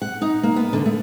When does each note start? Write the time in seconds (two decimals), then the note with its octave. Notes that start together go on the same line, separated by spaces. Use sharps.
0.02 F#5
0.21 D#4
0.43 A#3
0.56 B3
0.73 D3
0.85 A3